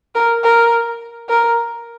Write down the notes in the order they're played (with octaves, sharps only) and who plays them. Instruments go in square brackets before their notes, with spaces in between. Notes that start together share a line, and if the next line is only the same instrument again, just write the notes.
[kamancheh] A#4
A#4
A#4